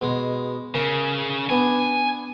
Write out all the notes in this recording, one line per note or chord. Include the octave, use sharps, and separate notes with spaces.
B2 G#3
C#3 A#4 E5
B3 D4 G#5